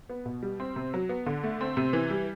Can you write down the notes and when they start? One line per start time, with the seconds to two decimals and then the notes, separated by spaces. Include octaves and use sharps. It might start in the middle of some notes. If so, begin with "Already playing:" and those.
0.09 B3
0.26 B2
0.43 G3
0.60 C4
0.76 C3
0.94 F#3
1.09 B3
1.26 D3
1.43 A3
1.61 C4
1.77 C3
1.93 E3
2.10 G3